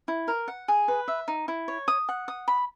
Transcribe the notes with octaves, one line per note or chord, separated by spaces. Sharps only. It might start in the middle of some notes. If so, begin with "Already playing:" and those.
E4
A#4
F#5
G#4
B4
E5
D#4
E4
C#5
D#6
F#5
D#6
B5